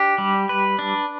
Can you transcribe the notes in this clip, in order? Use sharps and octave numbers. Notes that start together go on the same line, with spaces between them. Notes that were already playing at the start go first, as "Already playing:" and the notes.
Already playing: D4 G4
G3
B4
D4